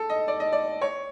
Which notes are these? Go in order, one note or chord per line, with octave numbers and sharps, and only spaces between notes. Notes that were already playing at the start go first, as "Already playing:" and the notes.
Already playing: A4
D#5
D5
D#5
D5
C#5